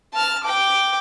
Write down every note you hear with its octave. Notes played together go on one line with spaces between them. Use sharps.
A5 F6
G5 D6